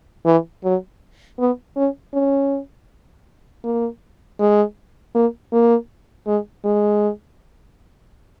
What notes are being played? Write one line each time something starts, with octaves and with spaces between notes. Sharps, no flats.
E3
F#3
B3
C#4
C#4
A#3
G#3
A#3
A#3
G#3
G#3